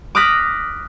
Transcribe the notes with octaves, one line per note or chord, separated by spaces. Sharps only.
D6 D#6 F6 F#6 A#6 B6